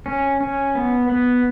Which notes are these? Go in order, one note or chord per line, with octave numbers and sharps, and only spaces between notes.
C#4
C#4
B3
B3